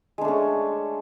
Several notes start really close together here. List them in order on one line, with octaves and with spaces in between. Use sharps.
G#3 D4 A3 C#4